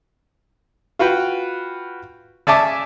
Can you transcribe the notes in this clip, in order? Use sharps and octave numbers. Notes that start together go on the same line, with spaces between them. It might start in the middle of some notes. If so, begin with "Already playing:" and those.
F4 F#4 B4 G5
C#3 D5 E5 G#5 A5 D6